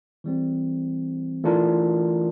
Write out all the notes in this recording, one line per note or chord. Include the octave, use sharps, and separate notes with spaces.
E3 G3 C4
E3 A3 D4 F4 A#4